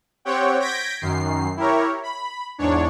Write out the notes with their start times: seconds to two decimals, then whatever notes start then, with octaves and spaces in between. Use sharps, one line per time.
0.25 C4 G4 C#5 F#5 G5
0.60 G6 G#6 A#6 B6 D7
1.01 F#2 D#3 C7
1.57 E4 G4 A#4 C#5
2.03 B5
2.58 E2 G#2 D4 C#5